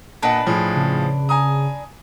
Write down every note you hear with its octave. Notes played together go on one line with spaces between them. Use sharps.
A#2 D4 B4 D#5 F#5
A2 F3 G#4
C#3
G#5 A#5 D#6